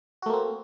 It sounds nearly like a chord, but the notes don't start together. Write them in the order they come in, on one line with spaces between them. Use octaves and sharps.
F#4 A3 A#3 C4